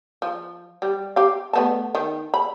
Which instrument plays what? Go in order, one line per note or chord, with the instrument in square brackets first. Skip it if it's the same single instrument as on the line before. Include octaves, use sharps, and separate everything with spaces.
[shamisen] F3
G3
G4 F5
A3 B3 A5
D#3
B5